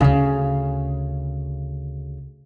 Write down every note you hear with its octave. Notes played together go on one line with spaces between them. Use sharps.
D2 C#3